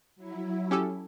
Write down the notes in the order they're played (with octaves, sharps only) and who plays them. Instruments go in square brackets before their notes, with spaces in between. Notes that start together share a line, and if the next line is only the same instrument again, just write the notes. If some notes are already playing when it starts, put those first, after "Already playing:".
[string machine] F#3 E4
[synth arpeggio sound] C#4 G4 A4